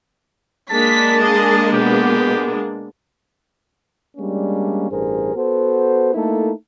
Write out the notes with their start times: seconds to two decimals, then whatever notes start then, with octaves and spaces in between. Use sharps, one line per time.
0.70 G#3 A#3 D4 A5 B6
1.22 G#4 D#5
1.73 B2 B3 G4
4.17 G3 G#3 A#3 C#4 D4
4.91 A1 G2 G#4 A#4 C5
5.35 B3 F#4 A4 C5
6.14 A3 A#3 D#4 E4 A4